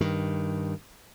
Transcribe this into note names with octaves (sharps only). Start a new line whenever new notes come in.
G2 D#3